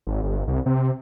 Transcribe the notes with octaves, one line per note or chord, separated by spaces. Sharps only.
G#1
G1
C2
C3